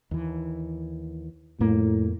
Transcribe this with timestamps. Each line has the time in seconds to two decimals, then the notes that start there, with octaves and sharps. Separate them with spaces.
0.11 D#2 E3
1.60 F2 A2 A#3